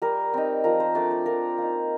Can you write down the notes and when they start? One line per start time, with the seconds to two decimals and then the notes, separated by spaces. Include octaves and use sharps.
0.02 G3 A#4
0.34 C4 D#4
0.64 F3 A#4
0.80 C5
0.95 A3 D4 D5
1.11 C5
1.26 F3 A#4
1.58 A#3 D#4